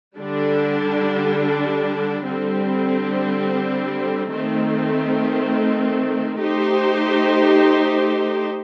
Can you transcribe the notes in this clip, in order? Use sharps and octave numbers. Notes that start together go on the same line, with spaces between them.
D3 G3 D4
D3 G3 C4
D#3 A3 C4
A3 D#4 G4 C5